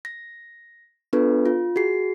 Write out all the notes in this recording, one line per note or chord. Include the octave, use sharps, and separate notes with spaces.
A#6
B3 D4 F4 A4 B4
F4
F#4 G#4 C7